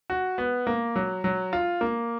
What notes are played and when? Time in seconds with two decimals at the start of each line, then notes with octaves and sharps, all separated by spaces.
0.10 F#4
0.38 B3
0.67 A#3
0.96 F#3
1.24 F#3
1.53 F4
1.81 A#3